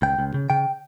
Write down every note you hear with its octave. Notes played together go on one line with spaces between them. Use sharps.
C#2 G5
C#2
C#3
C#3 G5